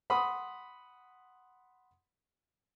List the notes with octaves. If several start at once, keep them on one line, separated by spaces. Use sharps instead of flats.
F#5 B5 C6 D#6